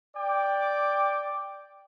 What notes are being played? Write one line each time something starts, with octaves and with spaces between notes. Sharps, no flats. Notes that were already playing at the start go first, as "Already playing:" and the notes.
D5 G5 D6